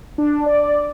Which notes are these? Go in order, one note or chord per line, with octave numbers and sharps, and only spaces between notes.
D4
D5